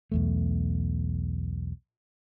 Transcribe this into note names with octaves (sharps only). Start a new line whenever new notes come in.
B1 E2 A3